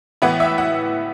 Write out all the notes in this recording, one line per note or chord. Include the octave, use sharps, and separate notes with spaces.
A2 E3 B3 E4 F#5
E5
F#5